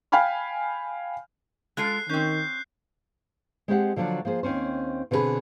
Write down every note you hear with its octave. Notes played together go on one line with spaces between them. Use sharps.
F5 G5 G#5 B5 F6
G#3 F4 A4 F#6 C7
D#3 C4 C#4 G6
G#3 C4 D#4 G4 F5 F#5
D3 F3 F#3 D4 F4 F#4
F3 A#3 G#4 C5
D#2 C4 C#4 C5
B2 D3 C4 E4 G#4 B4